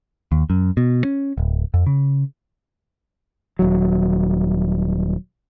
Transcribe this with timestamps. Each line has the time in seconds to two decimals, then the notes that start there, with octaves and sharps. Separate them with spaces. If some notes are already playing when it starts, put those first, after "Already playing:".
0.32 D#2
0.50 F#2
0.77 B2
1.05 C#4
1.38 D1
1.74 F2
1.86 C#3
3.59 D#1 F#3